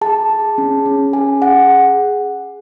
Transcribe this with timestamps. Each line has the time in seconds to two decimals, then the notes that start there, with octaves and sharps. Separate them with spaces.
0.01 G#4 A5
0.30 G#4
0.58 C#4
0.86 C#4
1.13 G#4 G#5
1.42 G#4 F#5